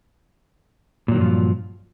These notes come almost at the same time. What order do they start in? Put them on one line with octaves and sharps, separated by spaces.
A#2 F#3 D#3 G2 F3